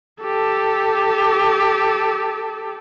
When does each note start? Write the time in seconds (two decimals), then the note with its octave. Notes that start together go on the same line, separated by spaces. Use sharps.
0.22 G4 A4